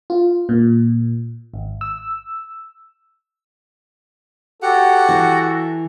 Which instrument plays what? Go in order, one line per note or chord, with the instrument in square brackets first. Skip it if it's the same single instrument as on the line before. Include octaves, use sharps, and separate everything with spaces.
[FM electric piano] F4
A#2
G#1
E6
[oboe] F#4 [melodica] G4 F#5 [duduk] A4
[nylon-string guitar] E3